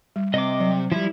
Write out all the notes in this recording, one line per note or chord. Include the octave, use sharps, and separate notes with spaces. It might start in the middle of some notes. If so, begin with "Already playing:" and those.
G3
C3 D#5 D6
F#3
F3 G3 E4